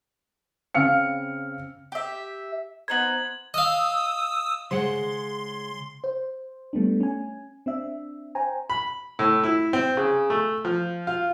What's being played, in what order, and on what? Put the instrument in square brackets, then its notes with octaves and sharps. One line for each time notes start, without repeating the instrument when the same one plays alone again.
[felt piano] C#3 C4 F5 F6 C#7
[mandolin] G4 E5
[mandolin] B3 D#4 C5 [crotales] G#6 F#7
[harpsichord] D#5 F5 [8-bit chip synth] D#6 E6
[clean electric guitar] C#3 F#5 [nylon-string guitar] G#3 C5 [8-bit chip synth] C6
[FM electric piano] C5
G3 A3 B3 D4
C#4 G#5
C4 D4 E5
C5 G5 G#5 A#5
[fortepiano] B5
A2
E4
C4
C#3
A3
F3
F4